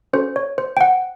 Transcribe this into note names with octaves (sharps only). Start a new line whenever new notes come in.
C#4 F#4 A4 C5
C#5
C5
G5
F#5